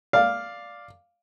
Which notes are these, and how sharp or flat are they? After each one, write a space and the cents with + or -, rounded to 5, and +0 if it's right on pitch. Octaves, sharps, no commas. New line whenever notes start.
D5 +0 F5 +0